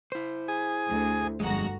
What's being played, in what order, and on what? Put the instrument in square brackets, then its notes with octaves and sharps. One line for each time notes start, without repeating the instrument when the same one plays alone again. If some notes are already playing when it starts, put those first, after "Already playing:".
[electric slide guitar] E4 C5
[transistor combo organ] G#4 G#5 D#6
[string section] D2
[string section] G1 F#4 A#5 [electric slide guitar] F2 G#3